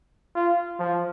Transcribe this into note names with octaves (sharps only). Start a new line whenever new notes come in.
F4
F3